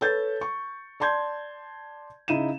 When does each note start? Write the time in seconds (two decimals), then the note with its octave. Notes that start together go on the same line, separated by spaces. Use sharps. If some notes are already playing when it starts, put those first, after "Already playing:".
0.01 A4 B4 C#5 G6 A6
0.41 C#6
1.00 D5 A5 C6 G6 G#6
2.28 C#3 D#4 E4 D#7 E7